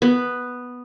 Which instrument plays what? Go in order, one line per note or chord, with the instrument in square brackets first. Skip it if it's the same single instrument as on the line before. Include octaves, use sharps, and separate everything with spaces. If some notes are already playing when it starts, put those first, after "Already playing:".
[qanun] B3